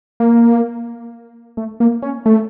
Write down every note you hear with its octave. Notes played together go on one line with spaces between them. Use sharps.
A#3
A3
A#3
C#4
A3